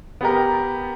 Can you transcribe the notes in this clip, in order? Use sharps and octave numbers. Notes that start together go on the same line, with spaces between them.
B3 G4 A#4